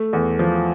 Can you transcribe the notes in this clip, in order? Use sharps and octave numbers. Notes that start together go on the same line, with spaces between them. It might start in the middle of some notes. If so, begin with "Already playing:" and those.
Already playing: A3
E2
F3